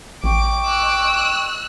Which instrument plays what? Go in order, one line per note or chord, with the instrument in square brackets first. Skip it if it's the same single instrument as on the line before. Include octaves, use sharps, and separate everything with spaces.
[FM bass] A1 [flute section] D#5 G5 C#6 [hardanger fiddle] D6
[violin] E6 F#6